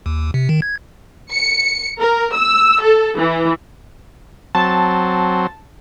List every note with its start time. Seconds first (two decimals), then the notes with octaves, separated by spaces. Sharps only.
0.06 D#2
0.34 C3
0.49 D#3
0.62 G#6
1.32 C#7
2.00 A#4
2.35 E6
2.83 A4
3.19 E3
4.55 F#3 C4 A5